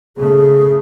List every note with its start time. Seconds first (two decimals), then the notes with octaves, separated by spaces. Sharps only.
0.17 C#3 A3 G#4